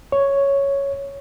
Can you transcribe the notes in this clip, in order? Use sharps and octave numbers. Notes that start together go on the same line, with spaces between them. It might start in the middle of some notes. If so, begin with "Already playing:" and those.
C#5